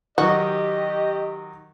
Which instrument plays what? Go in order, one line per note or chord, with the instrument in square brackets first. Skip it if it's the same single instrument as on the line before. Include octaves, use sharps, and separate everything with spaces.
[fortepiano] D#3 F#3 [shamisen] F#4 [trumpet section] G4 [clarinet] D#5